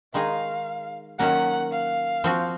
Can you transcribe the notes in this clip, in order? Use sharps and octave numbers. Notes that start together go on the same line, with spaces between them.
D#3 G#3 D#4 G#4 F5
D#3 F#3 A#3 C#4 F#5
F5
F3 C4 F#4